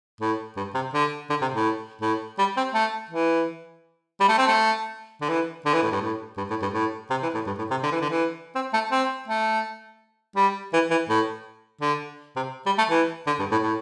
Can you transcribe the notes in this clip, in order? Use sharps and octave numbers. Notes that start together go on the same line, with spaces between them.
A2
G2
C3
D3
D3
C3
A2
A2
G3
C4
A3
E3
G3
A3
C4
A3
D3
E3
D3
E3
A2
G2
A2
G2
A2
G2
A2
C3
E3
A2
G2
A2
C3
D3
E3
D3
E3
C4
A3
C4
A3
G3
E3
E3
A2
D3
C3
G3
A3
E3
D3
G2
A2
A2